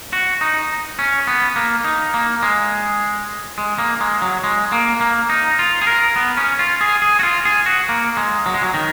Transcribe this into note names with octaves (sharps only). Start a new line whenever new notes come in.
F#4
D#4
C#4
B3
A#3
D#4
A#3
G#3
G#3
A#3
G#3
F#3
G#3
A#3
A#3
D#4
F4
G#4
A#4
B3
C#4
F4
G#4
G#4
F#4
F4
G#4
F#4
A#3
G#3
F#3
G#3
F#3
D#3